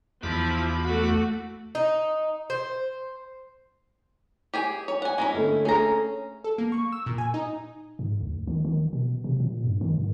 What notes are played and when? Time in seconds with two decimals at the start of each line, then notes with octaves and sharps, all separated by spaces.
0.23 E2 F3 E4 B5 D6
0.81 A3 F#4
1.75 D#4
2.50 C5
4.54 G4 G#4 G#5
4.88 C#5
5.02 F#5 G#5
5.18 G#3 C#4 E4 G#5
5.34 D3 A3
5.65 A3 C#4 G#4 A#5
6.44 A4
6.58 A#3
6.72 C#6
6.92 E6
7.06 A#2
7.18 G#5
7.34 D#4
7.99 G#2
8.21 D2
8.47 D#3
8.65 D#3
8.93 B2
9.24 C3
9.40 A#2
9.64 G2
9.81 D#3
9.98 G#2